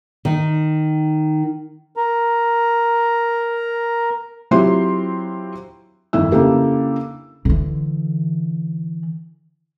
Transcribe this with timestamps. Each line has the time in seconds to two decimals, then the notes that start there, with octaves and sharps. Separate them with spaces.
0.25 D#3 D#4
1.97 A#4 A#5
4.51 F#3 C4 E4 F4 G4 C6
6.13 G1 F2 D#3 E4 E6
6.32 C#3 A#3 D4 E4 G4 A4
7.45 D3 E3